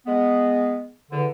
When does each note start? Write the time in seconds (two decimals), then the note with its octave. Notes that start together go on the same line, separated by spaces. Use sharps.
0.06 G#3 B3
1.11 E2 D3